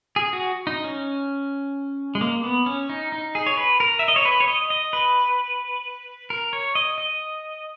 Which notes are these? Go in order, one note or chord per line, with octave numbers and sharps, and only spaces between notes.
G#4
F#4
D#4
C#4
G#3
A#3
B3
C#4
D#4
D#4
G#4
C#5
B4
A#4
E5
D#5
C#5
B4
C#5
D#5
D#5
B4
A#4
C#5
D#5
D#5